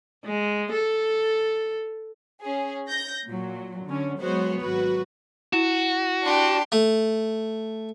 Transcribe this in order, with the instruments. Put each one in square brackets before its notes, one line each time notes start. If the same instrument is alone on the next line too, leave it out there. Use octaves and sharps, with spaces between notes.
[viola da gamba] G#3
A4
[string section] C#4 G#4
G6 A#6
A#2 F#3
D3 C#4
F#3 G#3 B3 F#4 C5 C#5
G#1 F#3 F#4 B4
[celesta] E4 E7 [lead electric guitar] F#4
[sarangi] D4 [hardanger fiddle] G4 C6
[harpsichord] A3